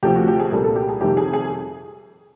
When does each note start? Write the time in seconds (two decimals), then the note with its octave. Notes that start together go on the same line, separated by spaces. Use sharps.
0.03 D2 C3 F3 G4
0.15 F#4
0.28 G4
0.40 G#4
0.51 C2 A#2 G3 A#3 A4
0.64 A4
0.76 G4
0.89 G#4
1.01 F2 C3 D#3 G3 G4
1.17 G#4
1.33 G#4